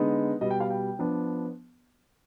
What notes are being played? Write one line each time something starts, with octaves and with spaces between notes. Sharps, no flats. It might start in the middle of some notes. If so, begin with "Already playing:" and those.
Already playing: D3 G#3 B3 D#4
B2 G3 B3 D#5
G5
F5
G5
F3 B3 D4